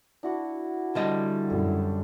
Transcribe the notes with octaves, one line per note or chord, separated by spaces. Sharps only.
D4 E4 F#4 F#5
D3 G3 D#5
F#2 A4